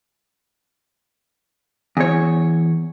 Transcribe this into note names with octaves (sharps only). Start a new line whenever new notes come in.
E2 C#5